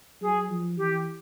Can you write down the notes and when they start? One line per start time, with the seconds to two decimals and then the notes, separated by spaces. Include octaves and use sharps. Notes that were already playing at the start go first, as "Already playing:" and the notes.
0.21 F#3 G#4
0.49 F3
0.77 E3 G4